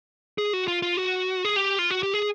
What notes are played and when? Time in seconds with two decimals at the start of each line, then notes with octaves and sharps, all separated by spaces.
0.38 G#4
0.53 F#4
0.68 F4
0.82 F4
0.97 F#4
1.45 G#4
1.56 G4
1.79 F4
1.91 F#4
2.03 G4
2.14 G#4